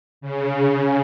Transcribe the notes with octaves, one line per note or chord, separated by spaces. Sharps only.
C#3